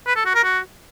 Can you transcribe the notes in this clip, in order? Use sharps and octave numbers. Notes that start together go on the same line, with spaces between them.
B4
A4
F#4
A#4
F#4